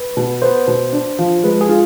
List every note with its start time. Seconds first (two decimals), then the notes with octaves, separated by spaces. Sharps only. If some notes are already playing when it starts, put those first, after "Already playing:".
Already playing: B4
0.17 B2
0.42 B3 C5
0.67 B2
0.92 D4
1.19 F3
1.43 G#3 B4
1.61 G#4
1.69 F4